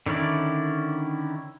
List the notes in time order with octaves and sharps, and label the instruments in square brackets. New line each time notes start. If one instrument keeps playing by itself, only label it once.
[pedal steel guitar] D3 D#3 C#4 E4 D5